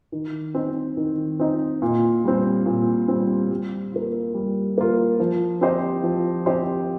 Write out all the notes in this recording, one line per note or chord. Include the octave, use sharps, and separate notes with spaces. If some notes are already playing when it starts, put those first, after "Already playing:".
D#3
C4 D#4
D#3
C4 D#4
A#2
G3 C4
A#2
G3 C4
G3
A#3 F4
G3
A#3 F4
F3
C4 G4 C5 D#5
F3
C4 G4 C5 D#5